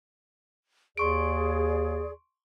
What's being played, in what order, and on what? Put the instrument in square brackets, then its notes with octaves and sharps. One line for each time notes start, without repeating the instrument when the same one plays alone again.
[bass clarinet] D#2 [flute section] G#4 D5 [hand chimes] C6 C#6 D7